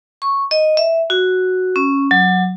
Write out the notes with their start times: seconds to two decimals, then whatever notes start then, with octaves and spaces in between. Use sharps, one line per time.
0.22 C#6
0.51 D#5
0.77 E5
1.10 F#4
1.76 C#4
2.11 F#3